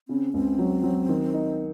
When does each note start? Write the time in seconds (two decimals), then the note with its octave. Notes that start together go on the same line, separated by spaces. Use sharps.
0.08 C#3 C4
0.34 C#2 C4
0.59 F#3
0.83 F#3
1.09 D#3
1.34 D#4